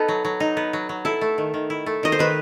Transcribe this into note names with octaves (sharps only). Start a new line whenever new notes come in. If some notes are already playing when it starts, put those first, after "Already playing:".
Already playing: B3 D#4 A4
F#3
F#3
D#4
B3
F#3
F#3
E4 A4
A3
D#3
D#3
E4
A3
D#3 D#5
C5
D#3 B4